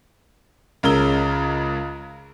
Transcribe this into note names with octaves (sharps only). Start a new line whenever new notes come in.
C#2 C#3 A#4 E6 G7